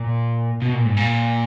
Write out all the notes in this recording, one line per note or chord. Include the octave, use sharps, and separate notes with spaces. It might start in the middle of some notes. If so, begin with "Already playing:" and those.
Already playing: A#2
B2
A#2
G#2
A#2